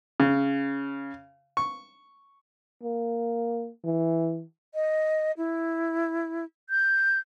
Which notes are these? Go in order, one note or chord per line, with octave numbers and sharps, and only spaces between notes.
C#3
C#6
A#3
E3
D#5
E4
G6